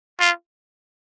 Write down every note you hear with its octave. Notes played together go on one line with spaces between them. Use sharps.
F4